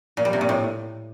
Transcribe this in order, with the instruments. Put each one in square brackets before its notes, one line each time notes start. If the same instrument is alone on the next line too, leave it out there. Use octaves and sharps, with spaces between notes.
[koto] A#2
G3
C3
A#2
A2